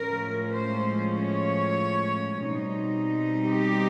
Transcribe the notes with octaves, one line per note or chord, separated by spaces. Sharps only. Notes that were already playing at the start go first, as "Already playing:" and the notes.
Already playing: A2 F3 G#3 C#4 A#4
C5
C#5
B2 G3 C4 D#4
G4